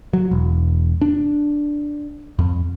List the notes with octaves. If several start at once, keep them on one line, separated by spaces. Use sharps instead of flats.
F#3
E1
D4
F2